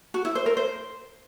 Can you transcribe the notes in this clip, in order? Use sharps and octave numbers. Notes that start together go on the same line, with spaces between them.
F#4
E4
C5
A#4
C5